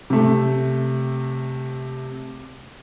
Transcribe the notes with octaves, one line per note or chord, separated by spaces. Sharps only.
C3 A3